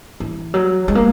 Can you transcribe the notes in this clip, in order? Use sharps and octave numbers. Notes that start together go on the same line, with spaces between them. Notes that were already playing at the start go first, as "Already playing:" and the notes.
E3
F#3
G#3
A#3